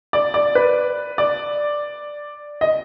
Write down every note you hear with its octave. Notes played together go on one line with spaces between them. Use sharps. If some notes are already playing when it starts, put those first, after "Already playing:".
D5
D5
B4
D5
D#5